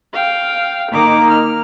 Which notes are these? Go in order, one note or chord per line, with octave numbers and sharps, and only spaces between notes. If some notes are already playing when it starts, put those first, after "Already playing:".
F5 G5
D#3 A#3 D#4 D6
F6